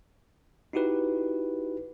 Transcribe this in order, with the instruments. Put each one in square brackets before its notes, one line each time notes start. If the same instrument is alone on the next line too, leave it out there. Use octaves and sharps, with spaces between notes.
[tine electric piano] D#4 E4 F#4 G4 B4